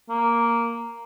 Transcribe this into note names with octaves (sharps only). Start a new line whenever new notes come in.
A#3